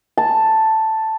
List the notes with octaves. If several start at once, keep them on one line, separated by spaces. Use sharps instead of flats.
A5